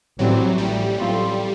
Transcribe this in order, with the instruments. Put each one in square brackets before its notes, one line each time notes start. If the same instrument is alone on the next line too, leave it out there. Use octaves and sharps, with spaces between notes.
[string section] A1 A2 E3 G3 C4 [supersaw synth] F#3
[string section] A1 A2 E3 [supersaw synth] G3
[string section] A2 F#3 A3 C4 F4